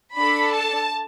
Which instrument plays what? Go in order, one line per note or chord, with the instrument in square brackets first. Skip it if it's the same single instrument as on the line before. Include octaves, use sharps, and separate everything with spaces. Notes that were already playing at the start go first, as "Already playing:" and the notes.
[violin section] D4 A4 B5
A5